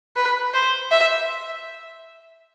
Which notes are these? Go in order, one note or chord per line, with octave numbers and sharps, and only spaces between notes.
B4
C5
E5